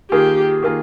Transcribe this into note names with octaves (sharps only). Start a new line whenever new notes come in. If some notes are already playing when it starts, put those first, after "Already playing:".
D#3 A#3 F4 G4 G#4
D#3 A#3 F4 G#4